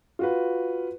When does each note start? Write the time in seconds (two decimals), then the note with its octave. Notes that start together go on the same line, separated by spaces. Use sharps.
0.19 F4 F#4 B4